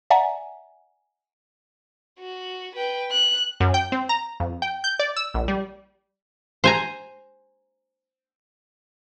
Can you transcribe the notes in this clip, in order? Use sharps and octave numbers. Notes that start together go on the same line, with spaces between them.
D5 E5 F#5 G#5 A#5
F#4
B4 G5
F#6
F#2
G5
C4
A#5
F2
G5
G6
D5
E6
A#1
G3
C5 G#5 A#5